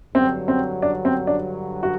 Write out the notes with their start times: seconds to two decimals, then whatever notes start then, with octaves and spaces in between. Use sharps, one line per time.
0.15 G2 D3 F#3 C4
0.48 C4
0.82 D4
1.05 C4
1.27 D4
1.83 F#4